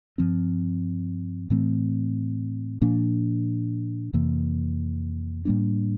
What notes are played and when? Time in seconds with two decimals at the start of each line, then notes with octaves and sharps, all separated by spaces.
0.18 G2 F3 C4
1.50 A2 E3 A3 C4
2.82 A#2 F3 A#3 D4
4.13 F2 C3 E3 A#3
5.45 A2 G3 A#3 D4